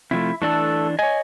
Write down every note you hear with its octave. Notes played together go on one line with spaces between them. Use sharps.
C3 F3 A3 E4
E3 A3 D4 A4
C#5 D#5 G#5